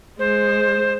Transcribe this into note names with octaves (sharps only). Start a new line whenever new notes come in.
G#3 C5